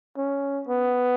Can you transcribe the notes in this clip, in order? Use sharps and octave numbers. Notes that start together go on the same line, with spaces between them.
C#4
B3